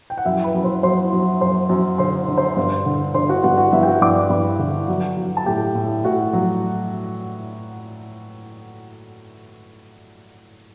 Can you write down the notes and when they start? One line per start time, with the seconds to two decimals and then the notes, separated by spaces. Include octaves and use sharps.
0.10 G5
0.18 F#5
0.25 F#2 E4 E5
0.44 B4 B5
0.55 F#2
0.64 C5 C6
0.83 F#3 C5 C6
1.13 F#3
1.41 F#2 C5 C6
1.69 F#2
1.98 D3 C5 C6
2.28 D3
2.38 C5 C6
2.57 G2
2.86 D3
3.14 D3 C5 C6
3.29 F#4 F#5
3.43 G2 F#4 F#5
3.58 F#4 F#5
3.72 G2 E4 E5
3.83 G5
3.87 F#4 F#5
4.01 G2 D5 D6
4.30 G2 B4 B5
4.59 D3
4.88 F#3
5.17 F#3
5.37 A5
5.46 A2 G4 G5
5.75 A2
6.04 A2 F#4 F#5
6.33 F#3